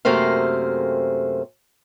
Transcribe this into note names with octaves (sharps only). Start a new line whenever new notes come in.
F#2 C3 A3 A#3 C5 F5